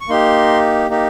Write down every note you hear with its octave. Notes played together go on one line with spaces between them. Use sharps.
C#6
A#3 D#4 G4 C6
A#3 D#4 G4